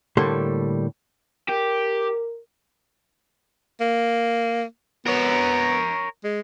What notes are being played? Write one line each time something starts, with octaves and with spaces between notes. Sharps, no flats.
A2 D3 G3 A#3 A4 C6
G4 A#4
A#3
B3 A#4 C#5
G#3